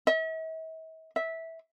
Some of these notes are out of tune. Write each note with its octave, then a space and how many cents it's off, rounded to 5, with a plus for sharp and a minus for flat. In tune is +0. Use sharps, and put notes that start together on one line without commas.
E5 -45
E5 -15